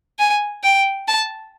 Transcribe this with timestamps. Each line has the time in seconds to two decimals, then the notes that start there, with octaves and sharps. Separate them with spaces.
0.19 G#5
0.64 G5
1.08 A5